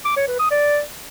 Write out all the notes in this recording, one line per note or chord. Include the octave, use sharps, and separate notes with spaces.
D6
C#5
B4
D#6
D5